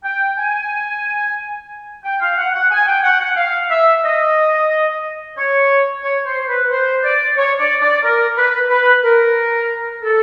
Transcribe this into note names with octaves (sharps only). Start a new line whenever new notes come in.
G5
G#5
G5
F5
F#5
F#5
G#5
G5
F#5
F#5
F5
E5
D#5
C#5
C#5
C5
B4
C5
D5
C#5
D5
D5
A#4
B4
B4
A#4
A4